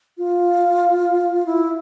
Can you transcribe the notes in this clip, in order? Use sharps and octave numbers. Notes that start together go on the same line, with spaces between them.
F4
E4